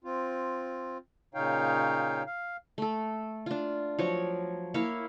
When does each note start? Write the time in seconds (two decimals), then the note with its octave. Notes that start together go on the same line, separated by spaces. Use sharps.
0.04 C4 F4
1.34 A#2 C#3 D#4 C#5 F5 G5
2.27 F5
2.78 A3 A4
3.46 D4 F4
3.99 F3 F#3 C#5
4.74 A#3 E4 C#5 F5